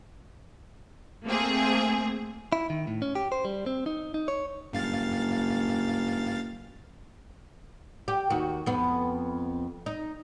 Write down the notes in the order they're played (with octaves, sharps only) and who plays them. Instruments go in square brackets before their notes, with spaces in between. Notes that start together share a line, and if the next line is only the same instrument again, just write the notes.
[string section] A3 A#3 C4 G#4
[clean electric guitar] E4
D#3
A2
C#4
G4
C5
G3
C4
D#4
D#4
C#5
[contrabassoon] F#1 [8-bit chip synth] G2 F5 A6
[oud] G4
D#2 F#4
F2 B3
D#4